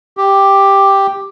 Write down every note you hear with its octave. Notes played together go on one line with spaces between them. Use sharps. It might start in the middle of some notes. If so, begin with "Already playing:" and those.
G4